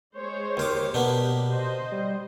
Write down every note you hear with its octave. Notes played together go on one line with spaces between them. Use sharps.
G#3 C5 C#5
D#2 A#4 D6
B2 A#3 B3 D4 G4
C5 D#5
G3